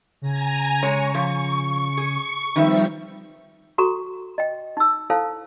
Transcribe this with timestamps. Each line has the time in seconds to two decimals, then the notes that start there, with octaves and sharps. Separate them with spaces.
0.22 C#3 G#5 A#5
0.82 G#3 C#5 C#6
1.15 F3
1.97 G#4
2.56 D#3 F3 G3 C4 D#4 B4 E5
3.78 F#4 A4 A#5 C#6
4.38 D#5 G5
4.77 D#4 E6
5.10 E4 A4 C5 F5 A5